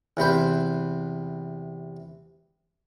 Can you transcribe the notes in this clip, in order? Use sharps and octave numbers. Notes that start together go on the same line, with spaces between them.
E2 C3 B4 C5